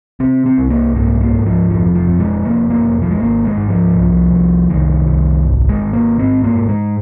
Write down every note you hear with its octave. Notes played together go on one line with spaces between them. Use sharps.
C3 C4
C4
C2
A#3
G#2 A#3
A#3
G#2
F3
F1 F3
F3
F2
G#3
F1 A#3
A#3
F1
F3
G#3
G#1 A#3
G#3
G#2
F3
C2
C2
C2 D#3
C2
G#1
G#3
G#1
A#3
G#2 C4
A#3
G#2
G#3